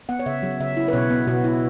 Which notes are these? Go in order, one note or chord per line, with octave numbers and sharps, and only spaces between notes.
B3 F#5
C#5
C#3 E5
F#3
C#3 E5
E4
B4
B2 C#5
B3
B2 F#4
E4